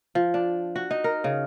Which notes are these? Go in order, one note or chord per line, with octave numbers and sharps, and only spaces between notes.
F3
D4
F#4
D#4
A#4
C#3